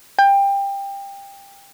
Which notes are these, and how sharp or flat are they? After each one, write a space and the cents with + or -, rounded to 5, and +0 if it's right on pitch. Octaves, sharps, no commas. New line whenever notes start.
G5 +20